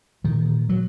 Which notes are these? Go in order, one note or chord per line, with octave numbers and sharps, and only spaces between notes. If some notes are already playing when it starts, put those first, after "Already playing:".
A#2 D#3
F#3